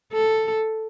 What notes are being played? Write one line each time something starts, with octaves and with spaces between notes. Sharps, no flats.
A4